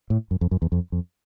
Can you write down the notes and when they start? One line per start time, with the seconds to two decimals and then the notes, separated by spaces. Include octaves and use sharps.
0.10 A2
0.31 F#2
0.41 F2
0.51 F#2
0.62 E2
0.72 F2
0.92 F2